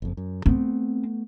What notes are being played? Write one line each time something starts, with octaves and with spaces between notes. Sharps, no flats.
F#1 F2
F#2
A3 B3 C4